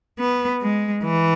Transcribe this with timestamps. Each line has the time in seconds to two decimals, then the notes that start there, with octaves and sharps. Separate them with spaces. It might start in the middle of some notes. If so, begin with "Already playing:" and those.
0.19 B3
0.62 G#3
1.04 E3